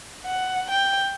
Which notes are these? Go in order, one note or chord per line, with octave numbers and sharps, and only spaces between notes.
F#5
G5